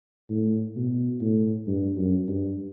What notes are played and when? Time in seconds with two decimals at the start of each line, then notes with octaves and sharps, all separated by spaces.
0.30 A2
0.76 B2
1.21 A2
1.67 G2
1.97 F#2
2.28 G2